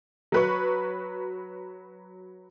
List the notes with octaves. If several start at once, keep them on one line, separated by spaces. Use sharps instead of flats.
F#3 B4 C#6